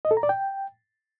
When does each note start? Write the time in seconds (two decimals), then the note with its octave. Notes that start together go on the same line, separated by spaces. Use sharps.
0.05 D#5
0.11 A4
0.17 A#5
0.23 D5
0.29 G5